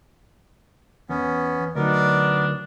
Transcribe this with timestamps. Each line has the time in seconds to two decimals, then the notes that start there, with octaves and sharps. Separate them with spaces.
1.09 E2 B3 C#4
1.75 D2 F#3 B3 D4 D#4 A#4